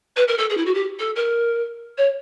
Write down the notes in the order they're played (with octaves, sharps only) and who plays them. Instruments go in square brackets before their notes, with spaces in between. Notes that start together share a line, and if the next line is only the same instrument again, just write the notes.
[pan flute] B4
A#4
A4
G#4
E4
F#4
G4
A4
A#4
C#5